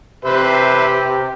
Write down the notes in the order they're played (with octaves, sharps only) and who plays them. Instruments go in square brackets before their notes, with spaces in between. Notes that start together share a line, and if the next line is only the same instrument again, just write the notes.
[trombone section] C3 G4 [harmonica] B4 C5 E5